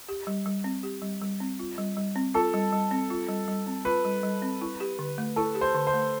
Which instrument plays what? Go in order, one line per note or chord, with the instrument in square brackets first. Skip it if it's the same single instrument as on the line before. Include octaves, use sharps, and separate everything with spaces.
[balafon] G4
G3
G3
C4
G4
G3
G3
C4
F4
G3
G3
C4
[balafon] F4 [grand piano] A4
[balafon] G3
G3
C4
F4
G3
G3
C4
[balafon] F4 [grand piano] B4
[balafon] G3
G3
C4
E4
G4
D3
A3
[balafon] E4 [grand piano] A4
[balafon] G4
[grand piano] C5
[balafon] D3
[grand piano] C5
[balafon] A3